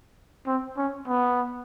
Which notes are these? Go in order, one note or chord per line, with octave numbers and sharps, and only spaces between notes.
C4
C#4
B3